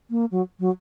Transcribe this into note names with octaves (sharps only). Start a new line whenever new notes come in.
A#3
F#3
F#3